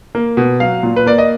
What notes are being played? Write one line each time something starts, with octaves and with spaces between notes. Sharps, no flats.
A#3
B2
F#3 F5
A#2
B4
A#3 D5
D#5